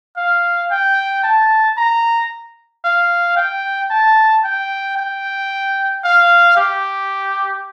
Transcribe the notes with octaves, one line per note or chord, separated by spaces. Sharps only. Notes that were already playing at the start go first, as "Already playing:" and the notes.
F5
G5
A5
A#5
F5
G5
A5
G5
G5
F5
G4